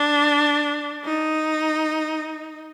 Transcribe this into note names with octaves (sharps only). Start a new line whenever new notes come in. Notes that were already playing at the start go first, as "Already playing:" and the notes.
Already playing: D4
D#4